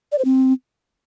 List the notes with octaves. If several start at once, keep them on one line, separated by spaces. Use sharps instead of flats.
D5
C5
C4